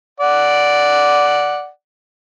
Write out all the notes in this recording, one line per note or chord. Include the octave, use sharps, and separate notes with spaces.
D5 F#5